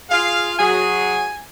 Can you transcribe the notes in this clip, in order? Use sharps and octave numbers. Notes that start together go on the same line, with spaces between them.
F4 G#4 F5
F#3 G#4 G#5